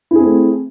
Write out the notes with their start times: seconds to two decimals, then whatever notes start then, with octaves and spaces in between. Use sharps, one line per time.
0.11 E4
0.15 G#4
0.20 C4
0.24 A3